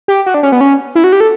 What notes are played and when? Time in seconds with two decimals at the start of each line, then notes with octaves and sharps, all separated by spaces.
0.08 G4
0.26 F#4
0.34 D4
0.43 C#4
0.52 B3
0.61 C#4
0.95 E4
1.04 F#4
1.13 G4
1.20 A4